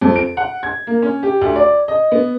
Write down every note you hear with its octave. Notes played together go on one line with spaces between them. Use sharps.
F2
D7
F#5
G#6
A#3
C#4
G4
D2
D5
D#5
B3